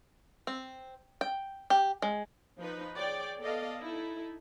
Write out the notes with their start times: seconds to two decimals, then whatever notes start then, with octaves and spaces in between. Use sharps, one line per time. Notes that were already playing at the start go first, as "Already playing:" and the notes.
0.47 C4
1.21 G5
1.70 G4
2.02 G#3
2.60 F3 D#4 B4
2.96 G#4 C#5 D5 G5
3.39 B3 A4 D5 D#5 F5
3.79 D#4 E4 A4